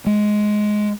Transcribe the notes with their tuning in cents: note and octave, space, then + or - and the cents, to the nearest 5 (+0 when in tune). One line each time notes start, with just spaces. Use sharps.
G#3 +10